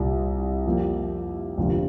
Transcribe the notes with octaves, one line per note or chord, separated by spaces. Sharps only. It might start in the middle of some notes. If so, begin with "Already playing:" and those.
Already playing: C2 A#2 G3
F2 F3 A#3 G4
G1 F2 C3 A#3 F4